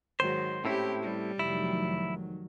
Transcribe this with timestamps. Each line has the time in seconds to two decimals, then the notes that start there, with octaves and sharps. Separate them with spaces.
0.20 G#2 D#3 F#3 C5
0.65 A2 C4 C#4 E4 G4
1.02 G3
1.39 F1 D#3 F#3 E4